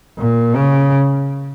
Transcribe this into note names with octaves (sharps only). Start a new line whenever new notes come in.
A#2
C#3